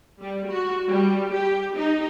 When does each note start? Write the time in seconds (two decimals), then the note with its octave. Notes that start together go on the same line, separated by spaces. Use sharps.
0.21 G3
0.50 F#4
0.89 G3
1.33 G4
1.76 D#4